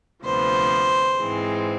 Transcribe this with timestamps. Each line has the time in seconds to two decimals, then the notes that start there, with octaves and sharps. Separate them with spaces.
0.24 D2 C3 F3 B3 C5
1.19 G#2 E3 G#3 C4